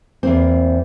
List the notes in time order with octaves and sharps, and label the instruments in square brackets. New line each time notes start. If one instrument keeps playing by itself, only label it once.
[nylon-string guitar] E2 A#3 C4